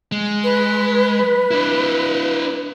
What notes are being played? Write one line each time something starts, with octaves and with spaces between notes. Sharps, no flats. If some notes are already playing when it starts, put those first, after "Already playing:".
G#3
B4
D4 E4